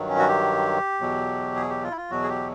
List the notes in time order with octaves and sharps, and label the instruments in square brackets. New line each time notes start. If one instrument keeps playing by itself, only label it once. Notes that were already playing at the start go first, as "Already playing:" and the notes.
Already playing: [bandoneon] G2 D#3 F#3
C#4
F#4
G4
E2 B2 F#3
G#4
G4
F4
E4
F4
E2 B2 F#3 F#4
G#4
G4